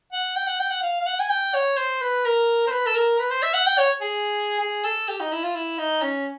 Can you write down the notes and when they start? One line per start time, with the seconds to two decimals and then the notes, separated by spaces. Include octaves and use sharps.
0.13 F#5
0.36 G5
0.47 F#5
0.60 G5
0.71 F#5
0.83 F5
1.01 F5
1.06 F#5
1.20 G#5
1.30 G5
1.54 C#5
1.77 C5
2.02 B4
2.25 A#4
2.67 C5
2.71 B4
2.86 A4
2.95 A#4
3.20 B4
3.31 C5
3.43 E5
3.54 F#5
3.67 G5
3.78 C#5
4.01 G#4
4.60 G#4
4.84 A4
5.09 G4
5.20 D#4
5.32 E4
5.44 F4
5.55 E4
5.79 D#4
6.02 C#4